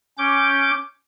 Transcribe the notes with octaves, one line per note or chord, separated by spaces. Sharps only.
C#4 D6 G6